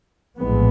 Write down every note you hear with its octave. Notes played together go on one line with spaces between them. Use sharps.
A#1 A2 E3 G#3 B3